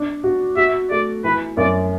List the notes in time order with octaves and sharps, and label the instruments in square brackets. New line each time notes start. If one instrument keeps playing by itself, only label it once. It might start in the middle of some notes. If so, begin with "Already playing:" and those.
Already playing: [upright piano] D4
F#4
[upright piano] F#4 [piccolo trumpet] E5
[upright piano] A3 [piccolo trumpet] D5
[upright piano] E3 [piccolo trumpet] B4
[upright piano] F#2 [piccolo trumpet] D5